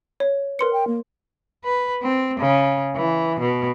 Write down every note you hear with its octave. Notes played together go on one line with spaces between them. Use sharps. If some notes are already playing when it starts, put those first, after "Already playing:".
C#5
A#4 B4 C6 C#7
G5
A#3
B4
C4
C#3
E3
B2